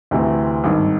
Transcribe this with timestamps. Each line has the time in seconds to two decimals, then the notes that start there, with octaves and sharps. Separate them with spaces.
0.11 D2 C3 E3 A3
0.64 G#1 G2 D#3